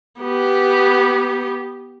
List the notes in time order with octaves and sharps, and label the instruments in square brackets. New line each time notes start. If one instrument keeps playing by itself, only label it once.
[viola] B3 G4